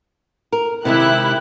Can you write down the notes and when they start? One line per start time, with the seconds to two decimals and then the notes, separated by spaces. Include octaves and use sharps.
0.52 A#4
0.85 C3 D#3 G#3 E4 G4 F#6